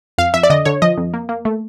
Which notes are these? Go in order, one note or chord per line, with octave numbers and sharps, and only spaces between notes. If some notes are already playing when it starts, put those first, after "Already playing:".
F2 F5
F2 E5
D5
D3 D#5
D3 C#5
F3 D#5
F2
A#3
A#3
A3